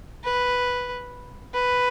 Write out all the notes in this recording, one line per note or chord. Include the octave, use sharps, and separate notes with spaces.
B4
B4